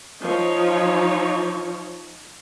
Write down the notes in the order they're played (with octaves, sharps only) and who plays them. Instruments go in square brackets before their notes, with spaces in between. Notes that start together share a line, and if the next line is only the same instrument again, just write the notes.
[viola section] F3 D#4 C#5